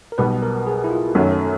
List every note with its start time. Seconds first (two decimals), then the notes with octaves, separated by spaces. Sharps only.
0.12 A#4
0.18 B1 B2 G3 B3 B4
0.42 A#4
0.67 G#4
0.84 E4
0.91 F4
1.15 F#2 D#3 F#3 A3 C#4 F#4
1.32 A4